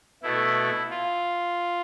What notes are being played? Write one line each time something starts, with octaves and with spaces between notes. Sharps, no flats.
B2 A3 E4
F4